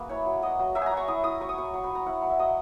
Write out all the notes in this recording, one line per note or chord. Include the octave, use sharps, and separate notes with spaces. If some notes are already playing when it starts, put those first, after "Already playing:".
Already playing: A#3 F#4 G#4 B4
E4 C#5
F#3
F#3 D#5
F#3
F#3 E5
G#5 A#5
F#3
C#6
E4 D#6
E4 D#6
F#3 C#6
D#6
F#3 C#6
F#3 C#6
B5
F#3 A#5
E4 F#5
F#3
E5
F#3 D#5